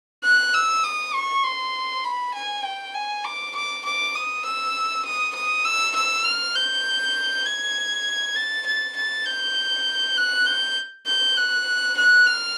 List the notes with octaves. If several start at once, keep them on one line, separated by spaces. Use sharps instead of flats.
F#6
E6
D#6
C#6
C6
B5
G#5
G5
G#5
D6
D6
D6
D#6
E6
D#6
D#6
E6
E6
F6
G6
G#6
A6
A6
A6
G6
F#6
G6
G6
F#6
F#6
F6